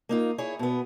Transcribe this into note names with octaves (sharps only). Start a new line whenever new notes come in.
A#3 D#4 F4
E4 G#4 C#5
B2 B3